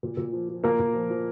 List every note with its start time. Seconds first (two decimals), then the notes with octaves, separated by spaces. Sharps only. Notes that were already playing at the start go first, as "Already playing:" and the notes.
0.03 A#2
0.17 A#2
0.33 F3
0.49 F3
0.64 A#2 A#3 A#4
0.79 A#2
0.94 F3
1.10 F3